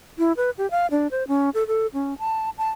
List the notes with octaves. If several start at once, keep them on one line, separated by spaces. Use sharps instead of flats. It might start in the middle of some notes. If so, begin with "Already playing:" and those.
E4
B4
G4
F5
D4
C5
C#4
A4
A4
C#4
A5
A5